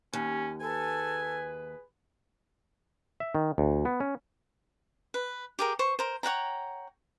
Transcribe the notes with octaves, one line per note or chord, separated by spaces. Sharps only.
D#2 C#4
G#4 A4 B4 G#5
E5
D#3
D2
B3
C#4
B4
G4 G#4 A#4
C5 C#6
A#4 C5
C#5 F#5 G5 A#5